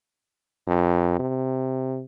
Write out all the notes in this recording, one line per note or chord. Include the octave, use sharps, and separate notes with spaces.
F2
C3